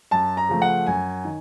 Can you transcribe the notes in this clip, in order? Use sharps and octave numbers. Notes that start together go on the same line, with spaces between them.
F#2 A5
A#5
C#3 F3 A3
F#5
F#2 G#5
D#3